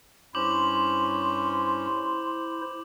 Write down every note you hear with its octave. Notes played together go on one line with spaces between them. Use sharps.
G2 C#4 E4 C5 C6 D6 F#7